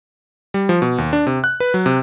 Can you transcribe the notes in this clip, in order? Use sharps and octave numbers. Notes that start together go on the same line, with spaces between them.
G3
F3
B2
D#2
D4
C3
F#6
B4
F#3
C3